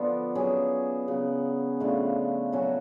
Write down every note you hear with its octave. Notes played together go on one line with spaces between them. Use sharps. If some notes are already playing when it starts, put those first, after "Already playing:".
Already playing: D3 F3 B3 D4
F#3 C#4 G#4
C#3 F#3 B3
C#3 F3 A3 D4
F#3 C#4 F#4 A4